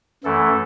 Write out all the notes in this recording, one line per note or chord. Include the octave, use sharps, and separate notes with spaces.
F#2 E3 A3 A4